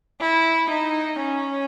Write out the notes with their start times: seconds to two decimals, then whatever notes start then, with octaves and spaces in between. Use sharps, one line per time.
0.21 E4
0.70 D#4
1.19 C#4